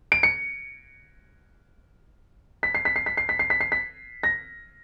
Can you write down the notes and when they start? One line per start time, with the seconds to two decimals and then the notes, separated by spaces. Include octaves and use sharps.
0.12 D7
0.23 C#7
2.63 B6
2.75 C7
2.85 B6
2.96 C7
3.06 B6
3.17 C7
3.29 B6
3.39 C7
3.50 B6
3.61 C7
3.72 B6
4.23 A#6